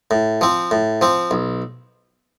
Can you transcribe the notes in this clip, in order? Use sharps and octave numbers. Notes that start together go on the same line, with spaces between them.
A2
F3 C4
A2
F3 C4
B1